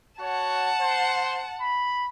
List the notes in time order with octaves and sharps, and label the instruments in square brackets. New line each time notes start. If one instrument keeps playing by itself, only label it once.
[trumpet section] F#4 C#5 [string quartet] F#5 A5
[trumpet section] C5
B5